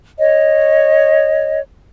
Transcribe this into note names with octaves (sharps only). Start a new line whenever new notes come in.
C#5 D#5